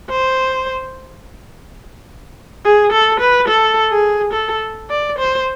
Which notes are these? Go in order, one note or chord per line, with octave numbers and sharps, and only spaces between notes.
C5
G#4
A4
B4
A4
G#4
A4
D5
C5